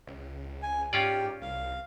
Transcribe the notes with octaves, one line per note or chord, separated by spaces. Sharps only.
C#2
G#5
G#2 C#4 F4 G4 D5
C2 F5